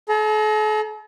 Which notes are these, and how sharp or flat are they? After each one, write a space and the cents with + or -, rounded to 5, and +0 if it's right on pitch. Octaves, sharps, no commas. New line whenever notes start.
A4 -45 A#5 +0